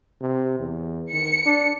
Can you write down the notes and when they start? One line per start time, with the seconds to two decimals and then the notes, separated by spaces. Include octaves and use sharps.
0.21 C3
0.59 E2
1.13 D#3 C#7
1.46 D4